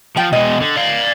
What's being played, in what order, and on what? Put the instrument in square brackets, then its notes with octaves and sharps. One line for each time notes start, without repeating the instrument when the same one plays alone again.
[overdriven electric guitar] F3 [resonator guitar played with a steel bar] G5
[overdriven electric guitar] B2 G#3 [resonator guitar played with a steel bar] D#5
[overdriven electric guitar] D3
D5 F5